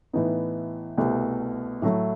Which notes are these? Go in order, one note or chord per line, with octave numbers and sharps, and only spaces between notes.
A2 E3 B3 D#4
C2 B2 A3
A2 F#3 A3 E4